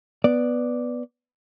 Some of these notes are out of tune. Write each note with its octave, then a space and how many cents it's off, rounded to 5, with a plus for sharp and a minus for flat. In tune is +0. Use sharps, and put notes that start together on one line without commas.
B3 +0 D5 +0